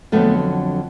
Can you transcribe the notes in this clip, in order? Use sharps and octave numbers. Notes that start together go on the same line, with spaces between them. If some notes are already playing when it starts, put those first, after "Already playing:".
F2 D3 F#3 A3 B3